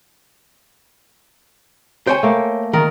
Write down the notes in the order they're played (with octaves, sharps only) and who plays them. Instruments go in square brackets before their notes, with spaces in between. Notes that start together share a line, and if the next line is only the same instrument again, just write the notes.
[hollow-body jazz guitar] C5 C#5 G#5 [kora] G5
[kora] A3 A#3
[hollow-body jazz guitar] D#3 [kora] A#4